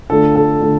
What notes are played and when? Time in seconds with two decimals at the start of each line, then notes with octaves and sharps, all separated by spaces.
0.10 D3 A3 D4 F4 A4
0.36 A4
0.61 D3 A3 D4 F4